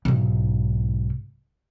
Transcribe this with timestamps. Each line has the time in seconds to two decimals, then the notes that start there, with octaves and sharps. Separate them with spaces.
0.05 B1 G#2